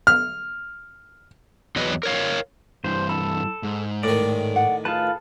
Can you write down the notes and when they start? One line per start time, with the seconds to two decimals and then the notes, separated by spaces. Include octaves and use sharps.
0.07 F6
1.76 E2 F#3 B4 D#5
2.03 A#4 C#5 F5
2.84 G2 E3 C5
3.09 A4 B5
3.63 G#2
4.03 A2 D#3 D5
4.56 F#5
4.85 F4 G#4 A4 B4 A5